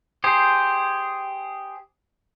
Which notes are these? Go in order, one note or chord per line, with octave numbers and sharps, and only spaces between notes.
G4 G#4 C5